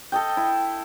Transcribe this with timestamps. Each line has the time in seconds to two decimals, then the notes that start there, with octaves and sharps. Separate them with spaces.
0.12 A4 D#5 G5
0.37 E4